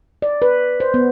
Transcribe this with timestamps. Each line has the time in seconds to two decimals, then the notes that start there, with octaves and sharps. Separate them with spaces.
0.22 D5
0.42 B4
0.80 C5
0.94 B3